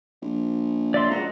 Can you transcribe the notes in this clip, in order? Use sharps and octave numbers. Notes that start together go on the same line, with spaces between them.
A#1
D5 E5 C6
C#2 F#4 D#5 A#5